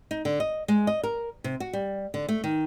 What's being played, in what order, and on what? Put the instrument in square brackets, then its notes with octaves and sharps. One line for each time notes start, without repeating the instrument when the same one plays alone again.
[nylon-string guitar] D#4
D3
D#5
G#3
D#5
A#4
C3
F#4
G3
D3
A3
D#3